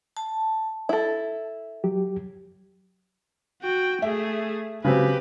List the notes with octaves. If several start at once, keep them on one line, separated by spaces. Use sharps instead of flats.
A5
E4 A4
F#3 G4
F#4 G5
A3 G#4 E5
C#3 F#3 C4 G4 B4